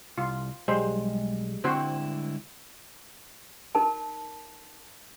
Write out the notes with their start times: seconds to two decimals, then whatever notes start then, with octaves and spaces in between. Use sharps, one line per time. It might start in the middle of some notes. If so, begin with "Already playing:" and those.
0.18 C2 F4
0.68 B1 G3 G#3 C5
1.64 D3 C4 E4 F#4 C5
3.75 D#4 A#4 A5